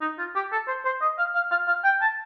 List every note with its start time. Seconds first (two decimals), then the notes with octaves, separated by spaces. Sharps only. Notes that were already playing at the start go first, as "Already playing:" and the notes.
0.01 D#4
0.19 F4
0.36 G4
0.52 A4
0.68 C5
0.85 C5
1.02 D#5
1.18 F5
1.35 F5
1.51 F5
1.68 F5
1.84 G5
2.02 A5